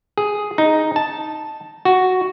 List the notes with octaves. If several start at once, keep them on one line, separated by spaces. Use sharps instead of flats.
G#4
D#4
A5
F#4